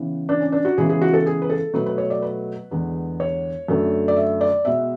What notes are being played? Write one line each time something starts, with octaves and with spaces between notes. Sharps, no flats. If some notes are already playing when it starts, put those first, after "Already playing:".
Already playing: C#3 E3 B3
D4
C#4
D4
F#4
C#3 E3 G#3 B3 G#4
G#4
F#4
A4
G#4
B4
A4
B2 F#3 A3 B4
B4
C#5
D5
B4
E2 D3 G#3 B3
C#5
F#2 D3 A3
D5
E5
D5
B2 G#3 B3 E5